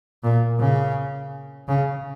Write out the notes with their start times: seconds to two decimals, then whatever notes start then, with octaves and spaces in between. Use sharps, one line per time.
0.23 A#2
0.59 C#3
1.68 C#3